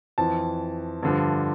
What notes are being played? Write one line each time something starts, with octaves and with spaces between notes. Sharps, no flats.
F2 E3 A5
G2 D3 F3